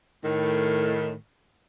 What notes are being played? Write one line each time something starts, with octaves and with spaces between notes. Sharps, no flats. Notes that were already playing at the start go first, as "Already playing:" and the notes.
A2 D#3